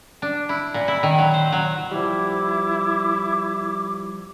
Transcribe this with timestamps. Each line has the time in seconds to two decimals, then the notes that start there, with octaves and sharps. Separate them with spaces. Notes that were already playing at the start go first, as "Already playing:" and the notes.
0.22 D4
0.49 E4
0.74 A#2
0.88 E4
1.03 D#3
1.18 F#3
1.34 C5
1.52 F#3
1.91 F3 G3 E4 D6